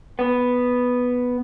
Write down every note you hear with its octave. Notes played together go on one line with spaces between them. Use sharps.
B3